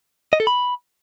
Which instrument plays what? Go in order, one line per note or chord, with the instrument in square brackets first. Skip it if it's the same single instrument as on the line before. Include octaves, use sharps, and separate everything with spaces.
[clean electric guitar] D#5
A4
B5